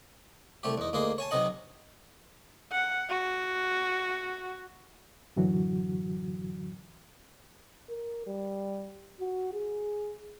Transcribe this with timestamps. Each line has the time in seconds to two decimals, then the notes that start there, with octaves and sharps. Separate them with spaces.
0.63 C2 A3 G4
0.78 E2 D#4
0.93 D2 A#3 D#4 G#4 C6
1.18 C#5 G#5 A5
1.31 B1 C3 D#4 D#5 F#5
2.71 F#5
3.09 F#4
5.36 F#2 A2 D3 E3 F#3 F#4
7.89 A#4
8.27 G3
9.20 F#4
9.53 G#4